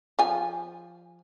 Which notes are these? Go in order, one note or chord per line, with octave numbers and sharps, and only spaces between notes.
F3 G#5